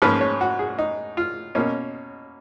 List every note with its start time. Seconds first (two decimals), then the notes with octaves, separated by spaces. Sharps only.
0.02 G#2 F3 A#3 C#4 B4
0.21 C#5
0.41 F#4
0.59 G#4
0.79 D#4
1.17 F4
1.55 B2 A#3 C#4 D#4